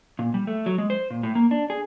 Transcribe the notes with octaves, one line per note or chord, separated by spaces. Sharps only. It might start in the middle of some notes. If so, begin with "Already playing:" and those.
A#2
G3
A3
F#3
G#3
C5
A#2
A2
A#3
D4
G#4